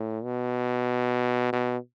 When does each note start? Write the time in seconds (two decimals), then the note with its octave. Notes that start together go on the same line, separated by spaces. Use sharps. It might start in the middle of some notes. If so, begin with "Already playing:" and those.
Already playing: A2
0.24 B2
1.53 B2